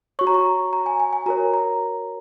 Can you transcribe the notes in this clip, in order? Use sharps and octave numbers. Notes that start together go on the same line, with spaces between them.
F#4 C#5 C#6
A#5
C#6
A#5
G#5
G#5
G#5
F#4 A#4 C#5 A#5
A#5